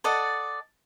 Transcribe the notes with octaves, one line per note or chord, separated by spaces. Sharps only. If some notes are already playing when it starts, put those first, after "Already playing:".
A4 D5 D#5 F#5